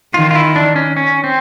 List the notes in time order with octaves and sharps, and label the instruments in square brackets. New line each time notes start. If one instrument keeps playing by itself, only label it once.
[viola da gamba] D#3 [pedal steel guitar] F4
[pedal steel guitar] F4
E4
D4
C#4
C#4
C4